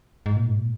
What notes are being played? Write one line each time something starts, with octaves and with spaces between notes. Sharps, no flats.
G#2
A#2
G#2
A#2